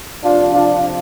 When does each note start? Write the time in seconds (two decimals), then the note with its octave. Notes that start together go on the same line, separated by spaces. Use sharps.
0.23 F2 C3 F3 D4 F4
0.52 D4 F4